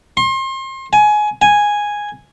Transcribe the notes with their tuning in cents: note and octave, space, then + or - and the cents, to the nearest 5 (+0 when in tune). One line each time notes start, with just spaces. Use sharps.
C6 +35
G#5 +20
G#5 -5